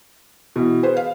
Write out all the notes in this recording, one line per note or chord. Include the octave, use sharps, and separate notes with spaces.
B2 E3
G#4 B4 C5
F5